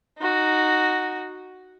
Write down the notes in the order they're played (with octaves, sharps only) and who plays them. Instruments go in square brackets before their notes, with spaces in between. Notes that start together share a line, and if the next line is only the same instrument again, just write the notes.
[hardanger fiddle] D#4 F#4